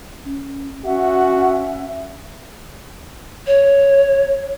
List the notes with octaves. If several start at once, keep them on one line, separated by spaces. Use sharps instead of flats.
C#4
C#4 F#4 E5 F#5
C#5